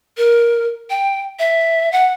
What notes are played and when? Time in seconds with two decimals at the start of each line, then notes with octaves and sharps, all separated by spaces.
0.17 A#4
0.90 G5
1.39 E5
1.92 F#5